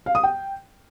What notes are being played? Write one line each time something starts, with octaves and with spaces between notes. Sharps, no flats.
F5
D#6
G5